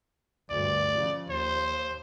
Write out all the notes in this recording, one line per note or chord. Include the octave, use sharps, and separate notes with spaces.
D2 G2 D5
C#3 F3
D#2 C5